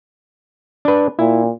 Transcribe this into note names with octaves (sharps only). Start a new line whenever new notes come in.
D4 B4
A#2 E4